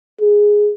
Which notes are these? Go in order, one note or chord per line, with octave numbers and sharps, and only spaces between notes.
G#4